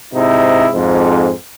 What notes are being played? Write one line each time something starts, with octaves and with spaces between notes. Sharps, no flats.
G#2 C3 D#4 E4
F2 G#2